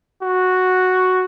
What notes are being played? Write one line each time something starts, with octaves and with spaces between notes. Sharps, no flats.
F#4